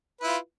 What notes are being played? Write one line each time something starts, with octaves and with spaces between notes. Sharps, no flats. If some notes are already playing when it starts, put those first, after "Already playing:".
E4 F4 B4